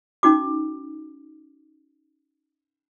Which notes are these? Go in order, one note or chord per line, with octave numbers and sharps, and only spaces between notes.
C#4 D#4 F#4 D6